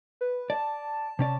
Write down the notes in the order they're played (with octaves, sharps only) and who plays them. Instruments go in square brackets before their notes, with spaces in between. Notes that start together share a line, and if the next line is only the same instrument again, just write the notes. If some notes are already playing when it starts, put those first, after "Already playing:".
[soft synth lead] B4
[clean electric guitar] D5 [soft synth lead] A5
[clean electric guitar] C3 C#4 D5